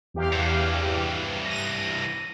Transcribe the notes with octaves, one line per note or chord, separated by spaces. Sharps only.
E2 G4 F5
G2 E3
A#6 D#7